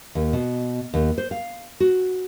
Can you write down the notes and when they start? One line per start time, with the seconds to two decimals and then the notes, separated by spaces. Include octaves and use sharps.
0.15 D#2
0.33 B2
0.94 D#2
1.18 C5
1.31 F5
1.80 F#4